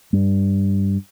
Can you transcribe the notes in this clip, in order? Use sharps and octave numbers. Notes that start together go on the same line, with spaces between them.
G2